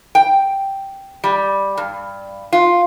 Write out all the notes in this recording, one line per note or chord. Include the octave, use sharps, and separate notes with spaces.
G5
G3
G2
F4